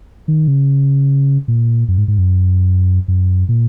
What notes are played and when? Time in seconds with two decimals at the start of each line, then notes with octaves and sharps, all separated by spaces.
0.28 D#3
0.48 C#3
1.48 A#2
1.88 F#2
1.98 G#2
2.08 G#2
2.18 F#2
3.08 F#2
3.49 A#2